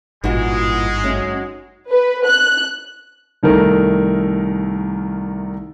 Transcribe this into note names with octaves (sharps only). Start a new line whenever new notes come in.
G#1 G2 A#2 E3 G#3 D#4 F#4
A3 C#4
B4
F#6
C2 D#3 A3 A#4